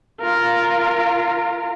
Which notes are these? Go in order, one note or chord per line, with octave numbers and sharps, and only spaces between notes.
F4 A#4